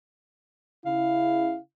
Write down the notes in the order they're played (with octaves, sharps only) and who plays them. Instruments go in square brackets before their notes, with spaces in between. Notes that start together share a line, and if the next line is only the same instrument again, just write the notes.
[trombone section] C#3 E4 [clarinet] F5